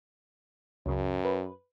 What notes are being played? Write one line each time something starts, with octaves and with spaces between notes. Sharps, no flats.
C#2 F#2 C#3
B4